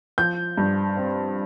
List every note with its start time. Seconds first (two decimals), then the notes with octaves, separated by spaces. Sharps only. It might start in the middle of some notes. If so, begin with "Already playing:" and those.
0.18 F3 G6
0.57 G2
0.97 C4